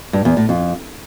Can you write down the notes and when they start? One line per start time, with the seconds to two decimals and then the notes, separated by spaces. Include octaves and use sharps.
0.13 G2
0.25 E2
0.37 A2
0.49 F2